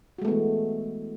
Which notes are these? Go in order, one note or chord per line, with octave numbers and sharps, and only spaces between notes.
E3 G#3 A3 B3 F#4